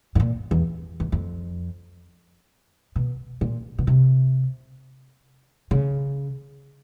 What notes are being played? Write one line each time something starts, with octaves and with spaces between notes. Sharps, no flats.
A2
A#2
E2
E2
F2
B2
A#2
B2
C3
C#3